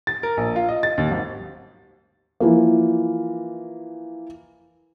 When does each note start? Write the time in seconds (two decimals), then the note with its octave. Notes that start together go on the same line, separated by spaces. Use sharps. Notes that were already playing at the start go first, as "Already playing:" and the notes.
0.07 A6
0.23 A#4
0.37 A#1
0.56 F4
0.69 D#5
0.83 A6
0.98 D#2
1.11 G#1
2.40 E3 F3 A#3